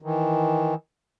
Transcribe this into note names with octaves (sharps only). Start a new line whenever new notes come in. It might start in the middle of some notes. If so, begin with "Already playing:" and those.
D#3 E3